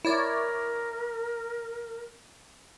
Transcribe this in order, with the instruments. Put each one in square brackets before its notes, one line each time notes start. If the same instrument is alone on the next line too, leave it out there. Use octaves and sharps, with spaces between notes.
[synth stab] E4 C#5 D5 [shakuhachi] A#4